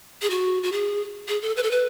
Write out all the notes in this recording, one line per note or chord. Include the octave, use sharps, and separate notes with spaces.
G#4
F#4
F#4
G#4
G#4
A4
B4
A4
B4